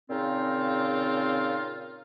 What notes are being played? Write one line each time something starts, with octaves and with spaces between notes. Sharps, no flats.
A#2 C#3 C4 D#4 F4